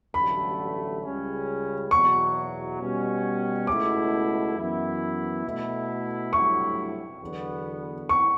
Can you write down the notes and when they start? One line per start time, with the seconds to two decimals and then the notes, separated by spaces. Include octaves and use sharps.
0.14 A1 G2 D3 F#3 A3 B5
1.02 C#2 C#3 G3 C#4
1.91 E2 B2 F#3 C#6
2.79 B2 G3 C#4
3.67 C#2 B2 A3 E4 D6
4.55 F#2 E3 B3 E4
5.45 B2 A3 E4
6.33 G2 F#3 A3 E4 C#6
7.21 E2 D3 F#3 B3
8.09 C#6